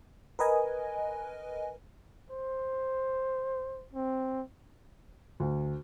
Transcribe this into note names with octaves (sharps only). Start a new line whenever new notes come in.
A#4 B4 D#5 G#5
C5
C4
D2